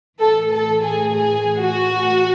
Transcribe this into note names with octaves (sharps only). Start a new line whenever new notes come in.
A2 E3 A4
A4
G#4
G#4
F#4